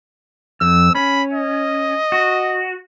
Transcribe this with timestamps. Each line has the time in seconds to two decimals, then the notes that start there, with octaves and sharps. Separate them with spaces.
0.61 F2 E6
0.95 C#4 B5
1.33 D#5
2.12 F#4